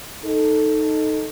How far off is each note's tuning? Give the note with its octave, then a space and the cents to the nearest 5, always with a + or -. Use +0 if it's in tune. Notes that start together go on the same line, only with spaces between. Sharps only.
D#4 +0 A4 +0